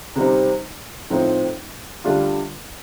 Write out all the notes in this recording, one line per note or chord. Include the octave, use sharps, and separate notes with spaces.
C3 G3 C4 D#4
A2 F3 C4 D#4
D2 D3 G3 D4 F4